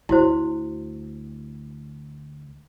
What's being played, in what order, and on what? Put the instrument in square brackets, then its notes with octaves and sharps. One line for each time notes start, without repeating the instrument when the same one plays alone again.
[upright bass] D2 [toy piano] E4 F#4 C5